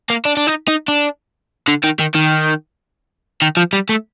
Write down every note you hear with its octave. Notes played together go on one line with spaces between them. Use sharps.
A#3
D4
D4
D#4
D#4
D4
D3
D#3
D#3
D#3
D#3
F3
G3
A3